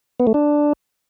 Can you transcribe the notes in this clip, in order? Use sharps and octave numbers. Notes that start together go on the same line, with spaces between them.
B3
A3
D4